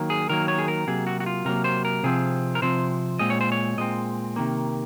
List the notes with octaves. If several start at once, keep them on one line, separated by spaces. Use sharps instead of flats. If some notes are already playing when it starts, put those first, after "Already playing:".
Already playing: D#3 F#3 A#3
G#4
D#3 F#3 A#3 A#4
C#5
G#4
A#4
C3 F#3 A#3 G#4
F#4
F#4
F4
C3 F#3 A#3 A#4
C5
A#4
C3 F3 C4 G#4
A#4
C3 F3 C4 C5
A#2 G#3 C4 D#5
C#5
C5
C#5
A#2 G#3 C4 D#5
C3 D#3 A#3